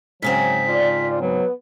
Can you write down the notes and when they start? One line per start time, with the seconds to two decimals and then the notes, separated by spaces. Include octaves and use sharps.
0.22 G#2 C#3 F#3 C4 B6
0.67 F4 D5
1.21 F#3 B3